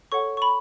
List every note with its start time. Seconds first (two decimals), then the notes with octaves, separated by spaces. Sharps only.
0.12 A4 C#5 F#5 C#6
0.37 C#6
0.42 B5